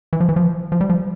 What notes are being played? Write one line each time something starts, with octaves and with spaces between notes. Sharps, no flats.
E3
F3
E3
F3
F3
G3
F3